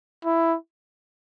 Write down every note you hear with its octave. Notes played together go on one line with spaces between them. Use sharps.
E4